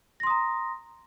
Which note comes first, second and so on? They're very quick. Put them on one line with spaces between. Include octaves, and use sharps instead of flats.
A#6 C6 D#6 A#5